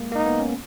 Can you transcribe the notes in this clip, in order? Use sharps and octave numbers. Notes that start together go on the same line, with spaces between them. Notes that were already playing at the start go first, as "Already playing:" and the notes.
Already playing: G#3 A#3
A#3 D#4
B3
C#4